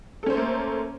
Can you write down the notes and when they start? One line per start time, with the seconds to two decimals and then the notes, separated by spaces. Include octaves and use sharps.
0.23 A4
0.26 C#4
0.30 C5
0.34 A3
0.37 A#3